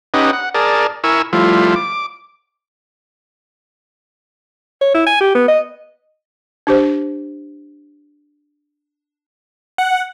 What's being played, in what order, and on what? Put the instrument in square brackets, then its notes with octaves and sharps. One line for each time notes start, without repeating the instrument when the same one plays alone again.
[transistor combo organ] C#4 D#4 G4 B4 D#5 F#5
F#5
G#4 A#4 D5 A5
E4 A#4 G#5 C#6 E6
F3 G3 A3 E4 F4
D6
[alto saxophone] C#5
E4
G#5
G4
B3
D#5
[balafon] D4 G4 C5
[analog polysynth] F#5